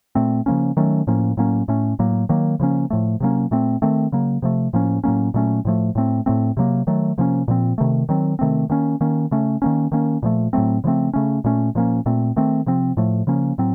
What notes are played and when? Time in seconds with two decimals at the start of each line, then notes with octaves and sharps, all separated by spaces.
0.15 A#2 A3 C4
0.46 C#3 F3 A#3 C#4
0.77 D#3 F#3 A3 C#4
1.07 A2 F3 A#3 C#4
1.37 A2 F#3 A#3 C#4
1.68 A2 A3 C#4
1.99 A2 F#3 A#3
2.29 D#3 F#3 A#3
2.60 C#3 F3 A#3 C#4
2.90 A2 F3 A3
3.20 C3 F#3 A#3 C#4
3.51 A#2 A3 C4
3.82 D#3 A3 C4
4.12 C#3 F#3 A#3
4.42 C3 F3 A3
4.73 A2 F3 A#3 C#4
5.04 A2 F#3 A#3 C#4
5.34 A#2 F#3 A3 C#4
5.65 A2 F3 A3
5.95 A2 A3 C4
6.26 A2 A3 C4
6.57 C3 F#3 A#3
6.87 D#3 F#3 A3
7.18 C3 F3 A#3 C#4
7.48 A#2 F3 C4
7.78 C3 D#3 A3
8.09 D#3 F#3 C4
8.39 C3 D#3 A3 C4
8.70 D#3 A#3 C#4
9.01 D#3 A#3 C#4
9.31 C#3 A3 C#4
9.62 D#3 A#3 C#4
9.92 D#3 A#3 C#4
10.23 A#2 F3 A3
10.53 A2 F#3 A3 C4
10.84 C#3 F3 A3 C4
11.13 C#3 A3 C#4
11.44 A#2 A3 C#4
11.75 A#2 F3 A#3 C#4
12.06 A#2 A3 C4
12.36 D#3 A3 C4
12.66 C3 F3 C4
12.97 A2 F3 A3
13.27 C#3 F3 A#3 C#4
13.58 A2 F#3 C4